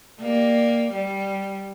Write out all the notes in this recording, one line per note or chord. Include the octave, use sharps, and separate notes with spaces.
A#3 G4 D5
G3